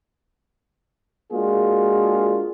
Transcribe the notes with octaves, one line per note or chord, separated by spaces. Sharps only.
G#3 A#3 D4 F4 F#4 G#4